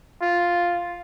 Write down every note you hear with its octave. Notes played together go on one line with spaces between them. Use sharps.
F4